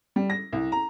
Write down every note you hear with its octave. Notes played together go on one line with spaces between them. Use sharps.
G3
A#6
C2
A#5